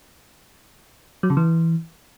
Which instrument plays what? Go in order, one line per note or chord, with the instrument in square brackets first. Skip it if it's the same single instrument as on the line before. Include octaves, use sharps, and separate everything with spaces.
[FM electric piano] F#3
C#3
E3